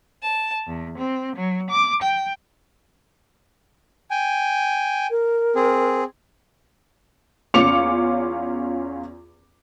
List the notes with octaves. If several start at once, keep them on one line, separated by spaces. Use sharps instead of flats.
A5
E2
C4
F#3
D6
G5
G5 G#5
A#4
C4 G#4
E2 C#4 F4 D6 C#7 F7